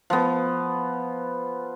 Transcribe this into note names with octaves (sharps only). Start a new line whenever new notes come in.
F3 B3